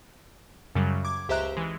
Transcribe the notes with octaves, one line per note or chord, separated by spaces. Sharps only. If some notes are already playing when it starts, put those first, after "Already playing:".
F#2 C#3 F#3 G3
D6 G#6
C#2 G4 C5 E5 A#5 F#6
E3 G#3